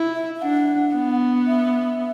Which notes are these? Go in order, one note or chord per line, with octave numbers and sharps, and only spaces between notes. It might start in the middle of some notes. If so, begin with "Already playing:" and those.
Already playing: E4
E5
E5
D4 F#5
B3
E5